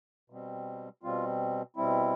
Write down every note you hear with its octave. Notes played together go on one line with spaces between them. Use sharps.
B2 G3 C4
B2 G3 C4 F4
B2 G3 C4 E4